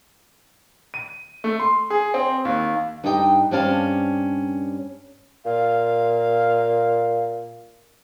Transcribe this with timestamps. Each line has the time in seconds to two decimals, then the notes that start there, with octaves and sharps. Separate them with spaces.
0.94 D#7
1.44 A3
1.60 C6
1.90 G#4
2.14 C4
2.45 D#2
3.04 G2 D#4 G4 D#5 G5
3.51 G2 C4 C#4 D5 F5 A5
5.45 A#2 F5